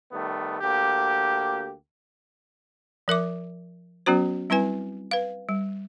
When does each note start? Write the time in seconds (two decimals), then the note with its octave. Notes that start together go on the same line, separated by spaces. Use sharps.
0.12 D#3 G3 A3 B3
0.61 D2 A#3 G4
3.08 F3 A#4 E5 D6
4.06 F#3 B3 C#4 F#4 C5
4.50 G3 C4 E4 B4 G#5
5.11 B4 F5
5.49 G3